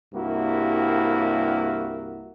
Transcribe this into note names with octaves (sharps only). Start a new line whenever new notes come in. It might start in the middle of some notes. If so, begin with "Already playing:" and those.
C2 G2 A#3 E4 F#4